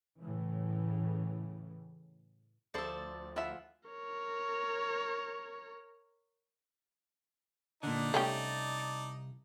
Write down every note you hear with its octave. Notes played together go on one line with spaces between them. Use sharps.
A2 C#3 E3
D2 F3 A4 C5 D5 E5
E4 F4 E5 F#5 G#5
A#4 C#5
A#2 D3 D#4 D5 A5
C2 A3 C#4 G4